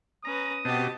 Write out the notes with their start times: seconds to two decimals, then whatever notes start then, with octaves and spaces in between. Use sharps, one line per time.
0.25 C#4 B4 A#5 D#6
0.65 B2 B3 C4 F#4 G4 D#5 A5